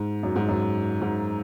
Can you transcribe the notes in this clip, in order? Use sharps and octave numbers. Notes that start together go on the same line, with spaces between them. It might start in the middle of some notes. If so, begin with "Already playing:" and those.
Already playing: G#2
F#2
G#2
F#2
G#2